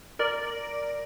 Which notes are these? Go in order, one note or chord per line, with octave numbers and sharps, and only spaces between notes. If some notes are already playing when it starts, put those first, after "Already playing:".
A#4 D5